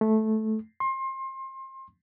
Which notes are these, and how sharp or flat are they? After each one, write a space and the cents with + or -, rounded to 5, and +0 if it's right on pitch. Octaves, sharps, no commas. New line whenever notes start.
A3 -10
C6 +30